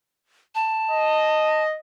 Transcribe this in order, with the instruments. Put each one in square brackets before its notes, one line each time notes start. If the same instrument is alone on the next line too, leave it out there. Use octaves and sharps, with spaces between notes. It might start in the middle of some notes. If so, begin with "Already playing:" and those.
[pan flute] A5
[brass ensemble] D#5